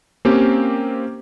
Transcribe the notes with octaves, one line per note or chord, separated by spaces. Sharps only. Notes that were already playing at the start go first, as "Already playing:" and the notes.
A#3 C4 C#4 G4